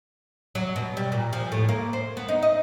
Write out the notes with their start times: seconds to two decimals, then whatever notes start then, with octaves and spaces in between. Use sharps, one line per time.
0.55 F#3
0.76 B2
0.97 G3
1.12 A#2
1.33 F3
1.52 A2
1.69 A#3
1.93 C5
2.17 B3
2.28 D#4
2.42 D#5